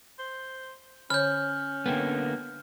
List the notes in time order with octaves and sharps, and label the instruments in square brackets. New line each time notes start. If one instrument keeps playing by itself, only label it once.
[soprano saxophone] C5
[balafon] D3 C#5 [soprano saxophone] C#4 [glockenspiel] F6 G6
[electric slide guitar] D3 A#3 B3 [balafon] A4 G5